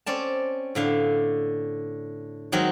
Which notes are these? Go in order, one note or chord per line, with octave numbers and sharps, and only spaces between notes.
C4 C#4 D5 A5
A2 D3 F5
D#3 F#3 G#3 C4